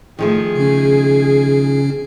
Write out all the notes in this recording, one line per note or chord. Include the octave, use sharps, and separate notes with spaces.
D#3 F3 A3 G#4
C#3 C#4